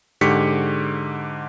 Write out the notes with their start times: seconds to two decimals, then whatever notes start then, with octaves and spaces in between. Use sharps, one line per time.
0.21 G#2 D3 G4 C#6 B6 C#7